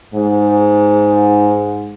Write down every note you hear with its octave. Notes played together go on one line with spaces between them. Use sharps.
G#2